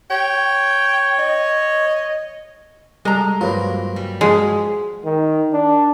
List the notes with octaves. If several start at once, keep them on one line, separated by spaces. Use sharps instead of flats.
C#5 G5
D#5
G3 G#3 A4 A#5
G2 F#3 A#3 F4 B4 C5
G3
F3 G#3 F#4 G#4
D#3
D4